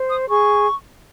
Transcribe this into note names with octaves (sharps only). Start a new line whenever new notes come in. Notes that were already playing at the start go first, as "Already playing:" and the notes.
Already playing: C5
D#6
G#4 C#6